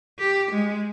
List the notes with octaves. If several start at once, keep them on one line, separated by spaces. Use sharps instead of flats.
G4
G#3